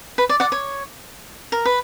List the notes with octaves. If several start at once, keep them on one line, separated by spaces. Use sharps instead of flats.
B4
D5
D5 F#5
C#5
A#4
B4